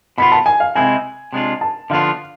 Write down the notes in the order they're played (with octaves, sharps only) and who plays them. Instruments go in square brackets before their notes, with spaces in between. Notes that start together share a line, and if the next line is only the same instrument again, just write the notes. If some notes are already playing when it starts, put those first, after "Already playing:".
[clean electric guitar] B2 B3 F4 [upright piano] B5
[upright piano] A5
G#5
F5
[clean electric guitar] C3 G#3 C4 E4 [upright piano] G#5
[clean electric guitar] C3 G#3 D4 F4
[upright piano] A5
[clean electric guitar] D3 F3 B3 D4 F4 [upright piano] F5